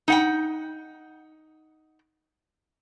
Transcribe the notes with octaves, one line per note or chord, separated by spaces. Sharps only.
D#4 F#5 G5